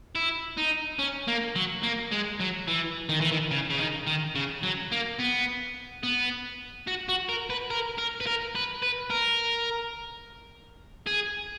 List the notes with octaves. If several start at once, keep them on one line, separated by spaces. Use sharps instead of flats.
E4
D#4
C#4
A#3
F#3
A#3
G#3
F#3
E3
D#3
E3
D#3
C#3
C#3
D#3
D#3
C#3
F#3
A#3
B3
B3
F#4
F#4
A#4
B4
A#4
A#4
B4
A#4
B4
B4
A#4
G#4